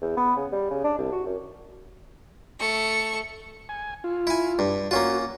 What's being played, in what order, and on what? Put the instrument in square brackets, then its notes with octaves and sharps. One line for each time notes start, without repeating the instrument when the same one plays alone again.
[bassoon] E2
B3
C#3
G3
C#3
D4
C2
F#4
F#2
[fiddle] A3 C#6
[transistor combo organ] G#5
F4
[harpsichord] E4 G#5
G2
[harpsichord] A#3 C#4 F4 [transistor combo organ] F#4